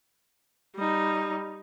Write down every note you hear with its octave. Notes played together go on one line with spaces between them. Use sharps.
G3 D#4